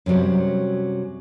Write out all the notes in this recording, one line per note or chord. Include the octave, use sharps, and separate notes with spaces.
F#2 C3 F#3 G3